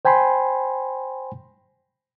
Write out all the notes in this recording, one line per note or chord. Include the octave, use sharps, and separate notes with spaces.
C5 G5 G#5 B5 C6